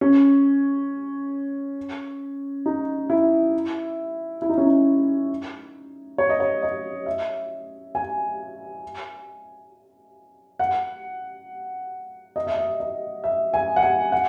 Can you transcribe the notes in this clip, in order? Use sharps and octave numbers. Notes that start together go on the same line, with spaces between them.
C#4
D#4
E4
E4
D#4
C#4
D#4
C#5
D#5
C#5
D#5
E5
G#5
F#5
D#5
E5
D#5
D#5
E5
G#5
F#5
G#5
F#5